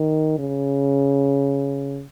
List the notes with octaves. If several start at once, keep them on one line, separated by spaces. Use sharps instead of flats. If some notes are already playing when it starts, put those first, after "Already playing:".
Already playing: D#3
C#3